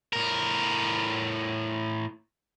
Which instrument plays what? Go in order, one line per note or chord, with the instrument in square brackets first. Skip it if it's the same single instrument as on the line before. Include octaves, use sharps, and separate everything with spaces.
[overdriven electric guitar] A2 A#4